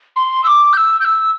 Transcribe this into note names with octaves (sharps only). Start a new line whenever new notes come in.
C6
E6
D6
G6
E6
G6
E6